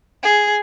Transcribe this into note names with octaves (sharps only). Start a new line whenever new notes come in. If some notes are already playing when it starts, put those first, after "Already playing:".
G#4